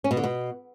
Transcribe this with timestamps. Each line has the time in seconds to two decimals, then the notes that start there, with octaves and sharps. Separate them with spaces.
0.04 C#4
0.11 B2
0.17 D3
0.24 B2